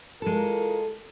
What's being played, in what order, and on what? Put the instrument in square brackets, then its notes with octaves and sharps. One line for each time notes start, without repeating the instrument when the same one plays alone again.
[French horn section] E3 F4 A#4 [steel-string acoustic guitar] G#3 A4